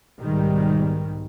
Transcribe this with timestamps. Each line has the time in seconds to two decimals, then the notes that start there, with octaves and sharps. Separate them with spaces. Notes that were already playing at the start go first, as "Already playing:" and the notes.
0.21 B1 G#2 D#3 G3